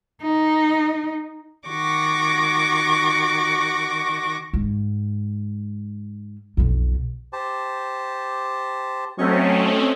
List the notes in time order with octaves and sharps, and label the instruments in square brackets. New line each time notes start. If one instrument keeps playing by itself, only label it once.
[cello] D#4
[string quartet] D#3 F#4 C#6 D6 A#6
[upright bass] G#2
B1 F2
[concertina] G4 C5 A5
[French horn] F#3 [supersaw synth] A3 C4 C#4 [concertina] D#5 C#6